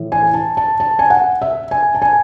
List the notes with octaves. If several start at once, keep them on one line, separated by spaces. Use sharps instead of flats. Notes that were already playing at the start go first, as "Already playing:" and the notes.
Already playing: A2 E3
G#5
A5
A5
A5
G#5
F#5
E5
G#5
A5
G#5